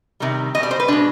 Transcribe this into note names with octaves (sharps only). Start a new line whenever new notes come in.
C3 D#3 G3
B2 G3 D#5
D5
C5
B4
B2 G#3 D4